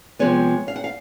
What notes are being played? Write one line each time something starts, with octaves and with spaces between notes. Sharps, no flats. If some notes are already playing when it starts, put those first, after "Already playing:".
C3 F3 G#3 B3 C#5
F5
F#5
F5